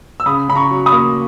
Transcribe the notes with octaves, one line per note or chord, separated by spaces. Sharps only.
E6
C#3 B5 D#6
C#3 B5
A#5 C#6
F#3
B5 D#6
A#3